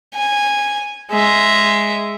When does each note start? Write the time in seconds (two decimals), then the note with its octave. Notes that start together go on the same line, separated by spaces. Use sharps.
0.14 G#5
1.12 G#3 E5